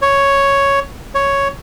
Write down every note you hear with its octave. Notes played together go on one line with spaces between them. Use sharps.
C#5
C#5